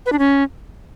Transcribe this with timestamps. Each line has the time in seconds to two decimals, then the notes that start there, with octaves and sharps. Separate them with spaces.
0.06 B4
0.12 D4
0.19 C#4